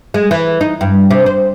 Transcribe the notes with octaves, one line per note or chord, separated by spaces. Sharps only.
G#3
E3
D#4
G2
C3
C5